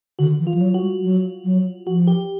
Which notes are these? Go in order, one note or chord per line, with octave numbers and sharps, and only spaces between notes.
D3 F#4
E3
F4
F3
F#3
F#4
G3
F#3
F#3
F3 F#4
G4